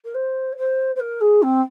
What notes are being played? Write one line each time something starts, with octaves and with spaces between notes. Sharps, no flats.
A#4
C5
C#5
C5
C5
A#4
G#4
C4